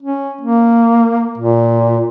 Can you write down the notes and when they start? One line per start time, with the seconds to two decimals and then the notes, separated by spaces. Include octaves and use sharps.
0.03 C#4
0.41 A#3
1.38 A#2